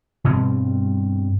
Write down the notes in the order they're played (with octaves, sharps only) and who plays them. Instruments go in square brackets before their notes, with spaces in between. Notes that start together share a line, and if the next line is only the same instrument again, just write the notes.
[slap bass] G2 B2 G3 C4